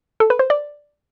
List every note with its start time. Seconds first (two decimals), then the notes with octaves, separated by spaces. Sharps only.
0.20 A4
0.30 B4
0.39 C5
0.50 D5